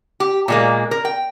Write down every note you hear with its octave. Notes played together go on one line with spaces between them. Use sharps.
G4
A#2 G#3 A#3
A#4
G5